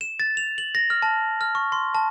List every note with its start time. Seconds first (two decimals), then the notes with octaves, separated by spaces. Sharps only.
0.01 E7
0.20 A6
0.37 F7
0.58 F#7
0.75 A#6
0.90 F6
1.02 A5
1.41 F6
1.55 C#6
1.72 C6
1.95 A5